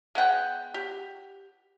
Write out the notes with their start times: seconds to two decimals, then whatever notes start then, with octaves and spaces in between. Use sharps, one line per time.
0.15 G#3 B3 F#5 G5
0.74 G4